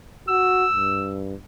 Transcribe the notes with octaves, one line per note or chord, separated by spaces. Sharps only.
F#4 E6
G2